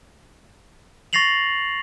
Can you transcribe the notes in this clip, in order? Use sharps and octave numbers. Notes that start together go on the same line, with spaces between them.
C#6 A6 A#6 C7 F7 F#7